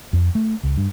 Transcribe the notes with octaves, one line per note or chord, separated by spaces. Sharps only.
F2
A3
C#2
G2